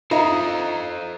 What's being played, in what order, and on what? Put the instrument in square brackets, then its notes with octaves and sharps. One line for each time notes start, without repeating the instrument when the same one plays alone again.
[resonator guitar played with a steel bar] D#4 [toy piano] F4 E5 [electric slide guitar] A4 C5 F5